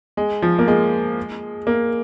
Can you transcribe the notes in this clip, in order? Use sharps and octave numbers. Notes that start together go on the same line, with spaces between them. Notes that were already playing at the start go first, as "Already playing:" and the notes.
G#3
F3
A#3
G#3
A#3